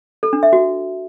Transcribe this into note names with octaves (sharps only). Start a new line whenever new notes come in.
A4
D4
E5
F#4